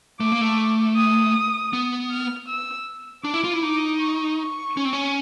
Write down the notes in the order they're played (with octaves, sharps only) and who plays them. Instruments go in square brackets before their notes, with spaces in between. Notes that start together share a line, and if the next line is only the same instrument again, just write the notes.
[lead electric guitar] A3 [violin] D6
[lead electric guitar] A#3
A3
[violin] D#6
[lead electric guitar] B3
[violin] F6
E6
[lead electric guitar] D4 [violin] D6
[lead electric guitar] E4
F4
E4
[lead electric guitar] D#4 [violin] D6
[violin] C#6
C#6
[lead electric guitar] C#4
C4
C#4